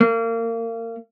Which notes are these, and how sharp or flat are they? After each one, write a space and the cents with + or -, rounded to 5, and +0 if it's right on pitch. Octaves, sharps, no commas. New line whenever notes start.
A#3 -30